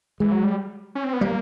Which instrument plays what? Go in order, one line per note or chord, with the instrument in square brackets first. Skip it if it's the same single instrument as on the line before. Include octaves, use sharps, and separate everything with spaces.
[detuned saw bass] E3 [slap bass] G#3
[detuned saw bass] F#3
G3
C#4
C4
B3
[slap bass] G3 [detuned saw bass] A#3